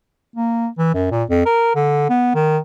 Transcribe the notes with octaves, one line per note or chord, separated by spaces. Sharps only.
A#3
E3
F#2
A#2
F2
A#4
D3
B3
D#3